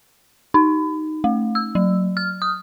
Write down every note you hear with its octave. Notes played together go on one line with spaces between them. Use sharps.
D#4
A3
E6
F#3
F6
D#6